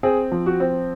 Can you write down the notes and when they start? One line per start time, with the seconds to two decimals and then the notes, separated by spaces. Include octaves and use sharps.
0.03 C4 G#4
0.32 F3
0.46 F#4
0.60 C4